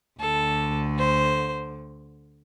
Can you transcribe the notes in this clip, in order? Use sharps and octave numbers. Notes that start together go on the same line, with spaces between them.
D2 D3 A4
C5